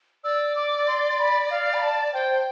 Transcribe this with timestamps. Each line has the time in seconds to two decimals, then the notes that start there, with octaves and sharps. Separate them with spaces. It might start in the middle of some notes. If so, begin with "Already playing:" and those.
0.24 D5 E6
0.56 D6
0.87 C6
1.19 B5
1.50 F5
1.74 B5
1.82 A5
2.13 C5 G5